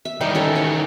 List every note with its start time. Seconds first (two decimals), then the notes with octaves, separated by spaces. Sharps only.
0.05 E5
0.21 D#3 E3 G3 D#4 G4
0.35 C#4 A4 A#5
0.56 C#5